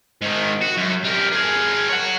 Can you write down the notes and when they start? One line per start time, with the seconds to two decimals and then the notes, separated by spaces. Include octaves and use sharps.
0.22 G#2 D#3
0.61 F#4
0.77 F#2
1.04 G3 A#4
1.31 G#4 A#4
1.89 C#5 F#5